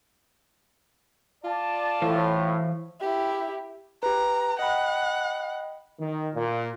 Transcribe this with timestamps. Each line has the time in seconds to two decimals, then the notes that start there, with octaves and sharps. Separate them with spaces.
1.44 F4 D5 A5
2.02 A2 E3 C5 F5
3.00 E4 G4
4.03 G4 B4 A#5
4.59 D#5 F#5 G5 B5
6.01 D#3
6.34 A#2